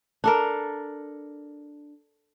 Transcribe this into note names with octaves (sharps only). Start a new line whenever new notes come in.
D4 A4 A#4